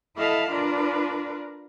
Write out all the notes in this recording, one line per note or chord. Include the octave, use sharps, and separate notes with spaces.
E4 A4 D#5 F5 A5 B5
D4 F4 A#4 B4 D5